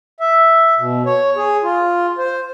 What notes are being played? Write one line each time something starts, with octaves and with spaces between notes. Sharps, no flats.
E5
B2
C#5
G#4
F4
C5